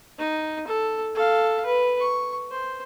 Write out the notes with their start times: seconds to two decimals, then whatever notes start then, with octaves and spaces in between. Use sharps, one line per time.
0.18 D#4
0.67 A4
1.15 A4 F5
1.66 B4
2.00 C#6
2.51 C5